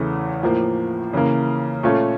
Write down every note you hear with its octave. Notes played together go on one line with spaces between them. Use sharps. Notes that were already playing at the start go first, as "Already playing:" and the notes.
Already playing: E2 C#3 E3 A3
A2 F3 A#3
C#3 E3 A#3
A#2 A3 C#4 F4 A4